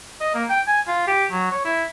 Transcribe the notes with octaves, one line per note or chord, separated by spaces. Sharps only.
D#5
A#3
G5
G#5
F4
G4
F#3
C#5
E4